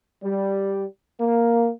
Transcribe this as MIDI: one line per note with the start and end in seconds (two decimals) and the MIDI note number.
0.23 0.86 55
1.21 1.71 58